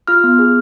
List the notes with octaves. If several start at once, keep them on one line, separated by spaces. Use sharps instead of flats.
F4 F6
B3
G#4